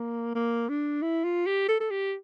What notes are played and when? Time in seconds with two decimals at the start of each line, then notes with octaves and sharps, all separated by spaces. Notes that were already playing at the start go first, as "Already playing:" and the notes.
Already playing: A#3
0.35 A#3
0.69 D4
1.02 E4
1.24 F4
1.46 G4
1.68 A4
1.80 A4
1.91 G4